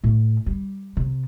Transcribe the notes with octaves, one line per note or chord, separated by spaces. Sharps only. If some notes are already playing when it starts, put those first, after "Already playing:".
A2
G3
C3